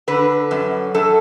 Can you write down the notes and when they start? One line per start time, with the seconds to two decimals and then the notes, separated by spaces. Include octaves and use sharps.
0.08 D3 B4
0.51 F#2
0.94 F#2 A4